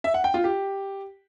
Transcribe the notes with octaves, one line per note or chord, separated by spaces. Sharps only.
E5
F#5
G5
F4
G4